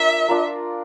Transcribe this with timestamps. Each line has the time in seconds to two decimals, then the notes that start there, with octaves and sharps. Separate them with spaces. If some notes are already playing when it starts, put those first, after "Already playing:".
Already playing: D4 F4 A#4 E5
0.28 D4 F4 A#4